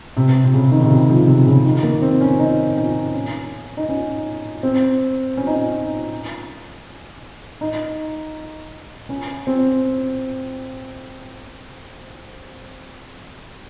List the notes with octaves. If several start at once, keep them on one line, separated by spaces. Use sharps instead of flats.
C3
C3
C#3
D#3
C3
C#3
F3
C3
C#3
D#3
A#3
C4
C#4
D#4
C#4
C#4
D#4
C#4
C4
C#4
D#4
C#4
D#4
C#4
C4